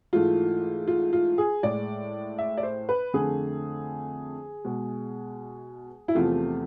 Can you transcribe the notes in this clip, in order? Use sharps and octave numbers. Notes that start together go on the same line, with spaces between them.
G#2 E3 A3 F4
F4
F4
G#4
A2 G#3 D5
E5
D5
C5
B4
F2 D3 A3 G#4
B2 G#3
E4
E2 C3 F3 A3 F4